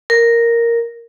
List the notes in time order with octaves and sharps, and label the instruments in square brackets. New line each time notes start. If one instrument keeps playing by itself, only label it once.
[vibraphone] A#4